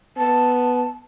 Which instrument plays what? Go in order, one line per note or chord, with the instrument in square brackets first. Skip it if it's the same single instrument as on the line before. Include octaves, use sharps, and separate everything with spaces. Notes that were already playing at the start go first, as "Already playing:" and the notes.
[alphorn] B3 [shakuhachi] A5